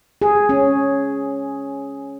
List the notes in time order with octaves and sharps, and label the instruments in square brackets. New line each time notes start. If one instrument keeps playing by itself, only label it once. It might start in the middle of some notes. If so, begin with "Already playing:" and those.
[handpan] G#4
C#4